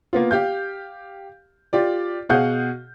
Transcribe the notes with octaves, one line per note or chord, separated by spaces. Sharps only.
A#3 B3 F4
G4 F5 G6
F4 G4 D5
B2 G#4 F5 F#5 G6